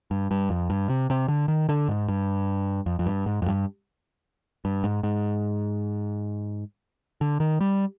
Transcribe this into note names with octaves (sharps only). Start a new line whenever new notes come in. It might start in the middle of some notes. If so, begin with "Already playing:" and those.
G2
G2
F2
G2
C3
C3
D3
D#3
D3
G#2
G2
F2
F2
G2
G#2
F2
G2
G2
G#2
G#2
D3
D#3
G3